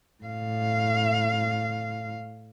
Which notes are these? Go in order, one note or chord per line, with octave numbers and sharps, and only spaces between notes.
A2 F5